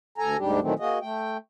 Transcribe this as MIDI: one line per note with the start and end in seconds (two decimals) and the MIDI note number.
0.18 0.37 38
0.18 0.37 69
0.18 0.37 80
0.18 0.37 82
0.37 0.60 38
0.37 0.60 44
0.37 0.60 55
0.37 0.60 62
0.37 0.60 67
0.61 0.74 46
0.61 0.74 51
0.61 0.74 52
0.61 0.74 54
0.61 0.74 57
0.61 0.74 60
0.79 0.99 58
0.79 0.99 66
0.79 0.99 68
0.79 0.99 75
1.01 1.37 57
1.01 1.37 79